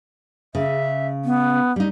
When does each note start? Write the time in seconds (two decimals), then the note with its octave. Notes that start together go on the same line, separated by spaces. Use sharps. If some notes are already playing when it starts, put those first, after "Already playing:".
0.55 C#3 E5
1.25 B3
1.76 G3 D#4